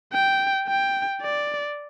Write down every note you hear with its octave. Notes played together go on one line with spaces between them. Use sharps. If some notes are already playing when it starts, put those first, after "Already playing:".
G5
G5
D5